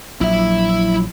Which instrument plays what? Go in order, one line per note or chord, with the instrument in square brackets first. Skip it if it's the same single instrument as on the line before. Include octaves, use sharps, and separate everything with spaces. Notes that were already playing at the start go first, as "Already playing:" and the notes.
[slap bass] A#1 [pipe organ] F#3 [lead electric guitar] E4 E5